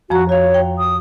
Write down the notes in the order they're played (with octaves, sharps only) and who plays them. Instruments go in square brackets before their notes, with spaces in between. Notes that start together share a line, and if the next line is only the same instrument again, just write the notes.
[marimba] F2 F3 A#5 [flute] F#4
[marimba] F#4 F5 [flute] C#5
[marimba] G5
[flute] D#6